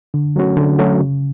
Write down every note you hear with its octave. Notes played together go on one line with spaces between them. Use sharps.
D3
F#3 A3 C#4 F#4
D3
F#3 A3 C#4 F#4
C#3